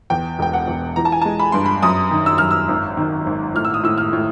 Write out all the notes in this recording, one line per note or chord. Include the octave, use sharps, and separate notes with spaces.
E2 G5
E1 G5
F#5
E2
E3 A#5
A5
G#5
G#3 A5
B5
G2 C6
B5
F#2 D#6
D#3
E6
F#2 F6
E6
G#1
D#3
G#1
A2 F6
E6
D#6
A2 E6
F6
A2